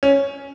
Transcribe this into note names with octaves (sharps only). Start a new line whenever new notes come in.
C#4